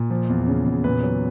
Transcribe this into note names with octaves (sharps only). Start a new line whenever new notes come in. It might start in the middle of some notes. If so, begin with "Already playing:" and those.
Already playing: A#2
F3
E2
C#3
E2
A#2 B4
F#3